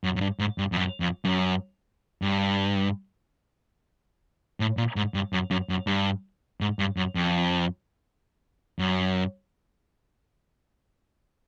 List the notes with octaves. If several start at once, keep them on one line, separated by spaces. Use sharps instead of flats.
F#2
F#2
G2
G#2
G2
F2
F#2
F2
F#2
G2
A2
A#2
G#2
G2
F#2
F#2
F#2
G2
G#2
G2
F#2
F2
F#2